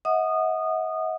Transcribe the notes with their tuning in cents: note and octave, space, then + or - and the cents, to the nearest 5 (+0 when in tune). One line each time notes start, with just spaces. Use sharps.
D#5 +45 F#5 -15 D#6 -20